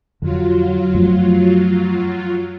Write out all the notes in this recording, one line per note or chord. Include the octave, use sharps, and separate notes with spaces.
F2 D3 F#3 F4
F#2 F3 A3